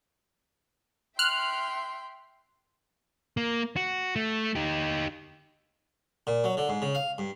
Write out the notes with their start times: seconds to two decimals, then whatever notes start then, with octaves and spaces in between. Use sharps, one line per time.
1.19 E5 G5 C6 F6 F#6
3.37 A#3
3.76 F#4
4.16 A3
4.55 D#4 G4
6.27 A#2
6.44 F#3
6.57 D3
6.69 G#2
6.82 C#3
6.95 F5
7.18 G2